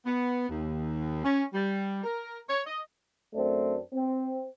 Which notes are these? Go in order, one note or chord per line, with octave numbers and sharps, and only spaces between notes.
B3
D#2
C#4
G3
A#4
C#5
D#5
F#2 A3 C4 D4
C4